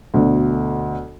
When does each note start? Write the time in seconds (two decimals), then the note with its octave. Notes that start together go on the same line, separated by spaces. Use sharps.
0.14 D2 B2 D3